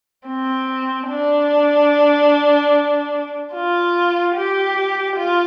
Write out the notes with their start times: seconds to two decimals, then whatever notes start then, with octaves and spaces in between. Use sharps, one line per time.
0.28 C4
1.09 D4
3.53 F4
4.35 G4
5.16 F4